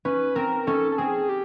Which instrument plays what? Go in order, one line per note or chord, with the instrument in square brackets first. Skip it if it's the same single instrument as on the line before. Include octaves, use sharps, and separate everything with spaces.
[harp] C#4 [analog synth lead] B4
[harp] C4 [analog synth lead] A#4
[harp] C#4 [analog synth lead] A4
[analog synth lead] A4
[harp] C4 [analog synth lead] G#4
[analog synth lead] G4